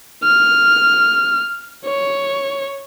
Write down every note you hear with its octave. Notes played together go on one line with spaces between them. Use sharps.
F6
C#5